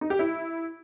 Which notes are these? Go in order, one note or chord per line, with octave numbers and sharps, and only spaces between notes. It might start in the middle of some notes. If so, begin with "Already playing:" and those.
D#4
G4
E4